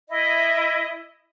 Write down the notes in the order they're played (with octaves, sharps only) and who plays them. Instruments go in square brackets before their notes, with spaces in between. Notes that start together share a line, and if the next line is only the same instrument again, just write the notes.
[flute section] E4 D#5